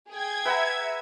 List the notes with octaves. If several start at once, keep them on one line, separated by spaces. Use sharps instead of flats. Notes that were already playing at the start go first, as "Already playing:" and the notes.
G#4 G5 G#6
B4 E5 F#5 A#5